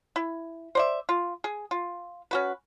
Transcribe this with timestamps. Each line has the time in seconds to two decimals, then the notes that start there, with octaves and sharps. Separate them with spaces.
0.16 E4
0.75 C5 D5 E5
1.09 F4
1.44 G#4
1.71 F4
2.31 C#4 F#4 B4